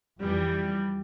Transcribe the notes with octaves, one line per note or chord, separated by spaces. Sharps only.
F2 E3 G3